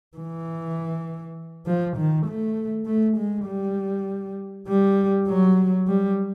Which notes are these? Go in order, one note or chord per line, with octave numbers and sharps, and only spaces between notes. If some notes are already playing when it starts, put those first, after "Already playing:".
E3
F3
D#3
A3
A3
G#3
G3
G3
F#3
G3